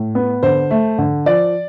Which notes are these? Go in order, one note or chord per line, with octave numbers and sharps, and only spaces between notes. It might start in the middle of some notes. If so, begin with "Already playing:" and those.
Already playing: A2
B3
D3 C5
A3
D3
F3 D5